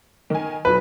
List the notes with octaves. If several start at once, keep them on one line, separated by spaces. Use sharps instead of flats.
D#3 G#5
B1 F#3 B4